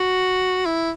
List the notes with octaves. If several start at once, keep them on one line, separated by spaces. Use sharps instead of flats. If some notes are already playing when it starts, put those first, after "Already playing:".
Already playing: F#4
E4